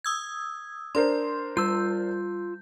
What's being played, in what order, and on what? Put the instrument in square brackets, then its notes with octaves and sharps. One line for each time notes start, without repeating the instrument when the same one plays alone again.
[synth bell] D#6 E6 G#6
[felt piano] D4 A#4 C5 [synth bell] C6
[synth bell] G3 G6 [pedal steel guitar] F4 E6